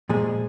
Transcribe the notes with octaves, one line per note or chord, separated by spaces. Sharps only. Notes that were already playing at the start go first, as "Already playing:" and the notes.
A#2 F3 G#3 G#4